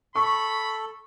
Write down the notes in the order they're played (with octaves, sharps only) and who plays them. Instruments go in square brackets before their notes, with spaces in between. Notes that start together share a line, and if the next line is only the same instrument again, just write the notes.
[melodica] A4 [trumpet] B5 [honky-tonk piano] C#6